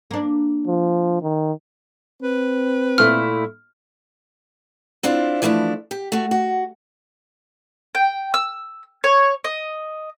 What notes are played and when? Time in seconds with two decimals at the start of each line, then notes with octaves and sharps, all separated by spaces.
0.11 A#3 D4
0.68 F3
1.23 D#3
2.22 C4 B4
2.98 A#2 A3 E4 F6
5.03 C4 D4 E4 F4
5.42 E3 F3 A3 D4 E4
5.91 G4
6.12 A3 F#4
6.31 F#4
7.95 G5
8.34 E6
9.04 C#5
9.44 D#5